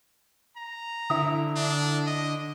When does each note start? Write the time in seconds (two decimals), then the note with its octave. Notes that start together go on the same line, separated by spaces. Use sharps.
0.57 A#5
1.10 D3 E4 D#6
1.56 D4
2.07 D#5